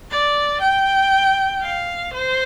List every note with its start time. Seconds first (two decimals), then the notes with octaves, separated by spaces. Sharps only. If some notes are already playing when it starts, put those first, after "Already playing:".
0.11 D5
0.61 G5
1.62 F5
2.13 C5